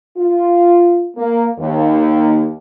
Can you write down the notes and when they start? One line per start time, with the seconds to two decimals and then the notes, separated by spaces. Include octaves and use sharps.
0.16 F4
1.17 A#3
1.58 D#2